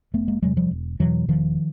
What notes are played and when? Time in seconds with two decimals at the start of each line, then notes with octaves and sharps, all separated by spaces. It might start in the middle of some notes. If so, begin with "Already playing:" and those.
0.13 F1 A3 B3
0.28 G#3 A#3
0.42 E2 C3 F#3 G#3
0.57 F3 G3
0.71 E1
1.00 E2 B2 E3 F#3
1.28 E1 D#3 F3